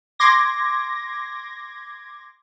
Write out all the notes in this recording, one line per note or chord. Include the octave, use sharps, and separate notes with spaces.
C6 D6 G#6 A#6